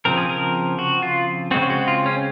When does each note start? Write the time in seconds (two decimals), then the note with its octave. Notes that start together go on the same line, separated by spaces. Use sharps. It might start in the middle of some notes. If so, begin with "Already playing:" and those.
0.05 C#3 F3 C4 A#4
0.17 G#4
0.29 A#4
0.79 F#4
1.02 F4
1.51 C#3 G#3 C4 F#4
1.70 F#4
1.88 F4
2.06 C#4